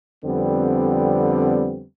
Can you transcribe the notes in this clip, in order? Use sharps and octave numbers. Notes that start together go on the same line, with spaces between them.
F2 D3 G3 B3 C4